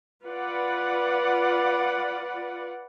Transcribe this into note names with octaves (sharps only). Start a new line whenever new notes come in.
F4 B4 D5 F#5